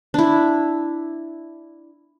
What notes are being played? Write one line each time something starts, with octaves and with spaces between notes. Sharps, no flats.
D4 E4